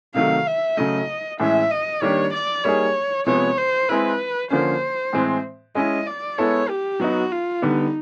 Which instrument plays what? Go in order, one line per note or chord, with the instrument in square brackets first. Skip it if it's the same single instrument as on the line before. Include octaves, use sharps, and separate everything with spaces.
[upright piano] C3 D#3 F#3 A3 [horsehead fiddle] F5
[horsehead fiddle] E5
[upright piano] C#3 F#3 A3 [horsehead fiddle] D#5
[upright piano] A2 E3 G#3 C#4 [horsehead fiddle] E5
[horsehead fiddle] D#5
[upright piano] D#3 G3 A#3 D4 G4 [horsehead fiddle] C#5
[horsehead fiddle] D5
[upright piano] G3 A#3 D#4 G#4 [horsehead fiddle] C#5
[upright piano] C3 F3 G#3 B3 [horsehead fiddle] C#5
[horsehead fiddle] C5
[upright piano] G#3 C4 E4 [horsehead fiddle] B4
[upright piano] D3 F3 A#3 C#4 [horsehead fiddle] C5
[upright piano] A2 E3 G#3 C4
[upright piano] G#3 C#4 E4 [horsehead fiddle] D#5
[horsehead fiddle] D5
[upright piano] G#3 B3 E4 A4 [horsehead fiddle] C#5
[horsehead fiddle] G4
[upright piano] F#3 B3 D#4 [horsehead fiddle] F#4
[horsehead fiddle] F4
[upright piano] D3 G3 B3 [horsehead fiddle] D#4